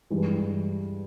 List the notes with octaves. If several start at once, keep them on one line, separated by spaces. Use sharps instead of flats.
G2 E3 G#3